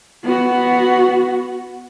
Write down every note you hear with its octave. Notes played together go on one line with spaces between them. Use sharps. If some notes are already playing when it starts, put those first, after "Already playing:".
B3 F#4